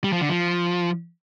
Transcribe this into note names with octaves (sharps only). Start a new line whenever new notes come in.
G3
F3
D3
F3